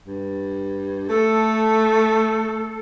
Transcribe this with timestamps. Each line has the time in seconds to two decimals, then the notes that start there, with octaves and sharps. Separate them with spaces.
0.06 G2
1.09 A3 A4